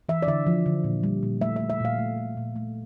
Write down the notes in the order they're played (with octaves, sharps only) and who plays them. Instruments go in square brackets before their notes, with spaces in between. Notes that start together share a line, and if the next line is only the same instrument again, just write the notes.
[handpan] E3 E5
D5
D3 E5
F3
D3
A#2
G3
A#2
A3 E5
E5
A3
E5
A#2 F5
A3
A3
A#2
A3